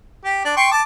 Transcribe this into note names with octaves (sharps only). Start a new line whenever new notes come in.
G4
D4
G5 C6 C#6
A5 D6